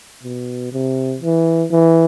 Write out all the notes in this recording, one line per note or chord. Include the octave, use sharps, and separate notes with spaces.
B2
C3
E3
E3